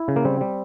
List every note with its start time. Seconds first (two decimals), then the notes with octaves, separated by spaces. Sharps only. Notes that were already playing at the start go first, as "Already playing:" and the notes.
Already playing: E4
0.08 C#3
0.16 A#3
0.25 G3 C4
0.41 G3